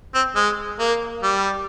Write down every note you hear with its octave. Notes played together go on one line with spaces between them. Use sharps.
C4
G#3
A#3
G3